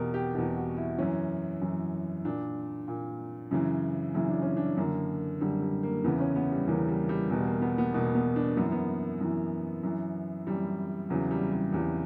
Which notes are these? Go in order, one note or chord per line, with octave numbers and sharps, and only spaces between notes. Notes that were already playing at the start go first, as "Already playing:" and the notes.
Already playing: E2 B2 G4 A#4
G4
E2 B2 G4
F#4
E4
F#2 E3 C#4
F#2 E3
A#2 D4
A#2
F#2 C#3 E3
F#2 C#3 E3 E4
D4
C#4
D4
F#2 D3 A#3
F#2 D3 G3
G3
A#3
E2 C#3 E3 B3
C#4
B3
G3
E2 C#3 E3 A#3
G3
G3
E2 B2 G3
A#3
B3
B3
E2 B2 A#3
B3
D4
F#2 E3 A#3 B3
B3
F#2 E3
F#2 E3
F#2 E3 G3
E2 C#3 E3 F#3
G3
G3
E2 C#3 E3 G3